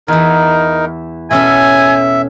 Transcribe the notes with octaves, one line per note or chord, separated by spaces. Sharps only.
E2 E3 D#4 A#4
B2 C#4 A4 E5 G#5